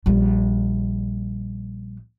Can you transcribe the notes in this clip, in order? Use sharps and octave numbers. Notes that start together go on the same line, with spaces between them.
A#1 G3